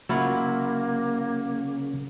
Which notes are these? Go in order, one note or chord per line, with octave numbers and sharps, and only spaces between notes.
C#3 F#3 A#3 E4 F4